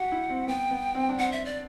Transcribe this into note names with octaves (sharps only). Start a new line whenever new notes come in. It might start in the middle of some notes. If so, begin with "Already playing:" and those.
Already playing: F#4 G4 F#5
E4
C4
B3 G5
B3
C4
D4
C4 F#5
E5
D5